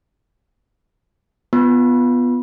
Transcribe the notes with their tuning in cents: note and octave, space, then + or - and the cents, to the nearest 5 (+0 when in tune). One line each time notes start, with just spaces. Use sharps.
B3 +0 F4 -10